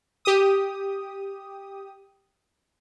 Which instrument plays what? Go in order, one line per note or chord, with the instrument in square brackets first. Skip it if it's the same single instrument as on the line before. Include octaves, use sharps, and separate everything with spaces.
[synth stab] G4 D#6